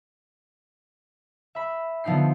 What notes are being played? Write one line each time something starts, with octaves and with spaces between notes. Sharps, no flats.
E5 B5
D3 F3 B3 D#4 G5 C7